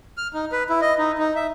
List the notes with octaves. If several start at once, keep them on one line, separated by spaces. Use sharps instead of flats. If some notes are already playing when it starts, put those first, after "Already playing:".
F6
D#4
B4
E4
D#5
D#4
D#4
E5